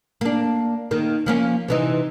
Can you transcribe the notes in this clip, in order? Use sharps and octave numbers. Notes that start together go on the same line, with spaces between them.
A#3 D4
D#3 A#3
F3 A#3 C#4
C3 E3 D#4